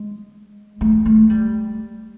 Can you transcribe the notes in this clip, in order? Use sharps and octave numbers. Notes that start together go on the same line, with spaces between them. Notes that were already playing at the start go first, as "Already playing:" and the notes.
Already playing: G#3
A3
A3
G3